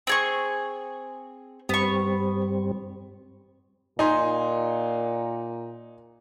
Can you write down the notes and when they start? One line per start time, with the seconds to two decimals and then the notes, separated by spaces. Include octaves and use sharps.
0.07 C4 G#4 C#6
1.69 G2 G3 B3 C4 C#6
3.99 A#2 D#4 G#5 C6